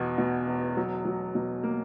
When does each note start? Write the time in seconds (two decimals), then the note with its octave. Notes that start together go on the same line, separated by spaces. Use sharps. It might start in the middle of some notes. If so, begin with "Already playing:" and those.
Already playing: E2 B2
0.18 B2
0.47 E1
0.77 F#3
1.05 F#3
1.35 B2
1.64 A#3